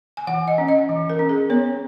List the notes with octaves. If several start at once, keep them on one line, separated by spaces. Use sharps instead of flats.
G#5
E3 F#5
D#5
C#4
D#5
E3
A#4
C#4
G#4
B3 C#5